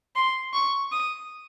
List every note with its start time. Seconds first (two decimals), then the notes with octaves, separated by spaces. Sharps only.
0.16 C6
0.54 C#6
0.92 D#6